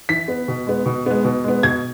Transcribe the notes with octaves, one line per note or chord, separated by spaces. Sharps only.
E3 B6
B3
B2
G#3 B3
B2
G#3 B3
B2
G#3 B3
B2 G#6